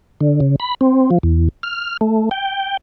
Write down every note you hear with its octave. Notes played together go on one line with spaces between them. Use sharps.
D3
C#3
B5
C4
F3
E2
F6
A3
G5